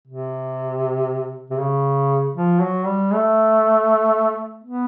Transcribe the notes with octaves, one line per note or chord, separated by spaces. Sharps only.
C3
C3
C#3
F3
F#3
G3
A3
B3